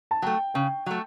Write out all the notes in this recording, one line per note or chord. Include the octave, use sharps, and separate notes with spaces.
A5
F#3 A3 G5
C#3 G5
F#3 A3